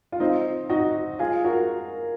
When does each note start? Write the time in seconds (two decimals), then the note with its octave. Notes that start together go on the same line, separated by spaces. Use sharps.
0.12 F4
0.20 C4 D#4
0.69 D#4 F#4
1.19 F4 G#4
1.44 F#4 A#4